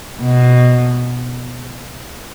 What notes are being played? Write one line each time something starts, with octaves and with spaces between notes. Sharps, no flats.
B2